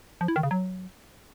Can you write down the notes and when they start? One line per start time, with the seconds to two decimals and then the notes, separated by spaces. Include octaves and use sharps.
0.21 F3
0.28 E4
0.36 D#3
0.43 C#3
0.51 F#3